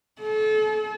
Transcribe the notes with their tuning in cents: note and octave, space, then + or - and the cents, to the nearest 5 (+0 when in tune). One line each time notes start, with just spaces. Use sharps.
A4 -35